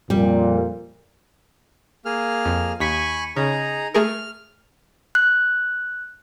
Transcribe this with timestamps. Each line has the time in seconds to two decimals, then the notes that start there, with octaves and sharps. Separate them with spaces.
0.10 F2 A#2 G3
2.05 A#3 G#4 F6
2.45 F2
2.80 D#2 G#5 B5 C#6 B6
3.36 C#3 D#4 G#4 A#5
3.94 A3 G#4 A#4 F6
5.15 F#6